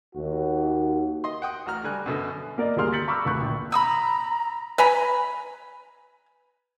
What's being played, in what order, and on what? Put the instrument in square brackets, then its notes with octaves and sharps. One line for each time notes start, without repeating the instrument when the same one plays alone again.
[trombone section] D#2 F#4
[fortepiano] D#5 C6
F#5 G5 D#6
A1 F#4 A#5 F6
D3 G3 G#5 F#6
F#2 B2 D3
[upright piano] A#3 A#4 D5 D#5
D2 G3 G#4 A#4 C6 F6
G6 A6 B6 C#7 F#7
A#5 B5 C#6 D6 E6 F6
F1 D2 B5 C#6 F#6
A#1
[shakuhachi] A#5 [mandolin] B5 D#6 E6
[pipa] B4 G#5 A#5 B5